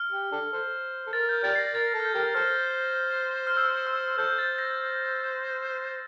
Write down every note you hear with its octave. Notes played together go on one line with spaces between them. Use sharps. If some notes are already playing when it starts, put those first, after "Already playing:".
Already playing: F6
G4
D4 A4
A4 C5
A4
A#4 A6
G6
G4 A#4 D5 A6
C7
A#6
A#4 A6
A4
F6
G6
G4 A#4
A4 C5 F6
F6
E6
E6
A4 C5 G6
A6
A#6